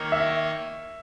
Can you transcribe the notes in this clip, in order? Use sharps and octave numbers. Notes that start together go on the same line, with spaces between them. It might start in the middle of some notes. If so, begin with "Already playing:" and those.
Already playing: D#3 A#3 D#4 A#4 C#5
E5